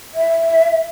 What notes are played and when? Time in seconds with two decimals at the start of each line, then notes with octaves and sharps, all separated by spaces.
0.14 E5